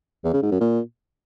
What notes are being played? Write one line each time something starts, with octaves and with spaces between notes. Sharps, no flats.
E2
C#3
G#2
F#2
A#2